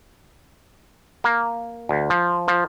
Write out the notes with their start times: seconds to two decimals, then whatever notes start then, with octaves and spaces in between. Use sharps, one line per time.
1.24 A#3
1.89 D2
2.10 F3
2.48 F3